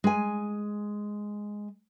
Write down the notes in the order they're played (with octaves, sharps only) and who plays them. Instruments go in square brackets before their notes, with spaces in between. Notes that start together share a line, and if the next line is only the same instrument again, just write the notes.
[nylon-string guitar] G#3 G#5